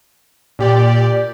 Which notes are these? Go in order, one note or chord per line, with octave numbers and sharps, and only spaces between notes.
A#2 G4 D5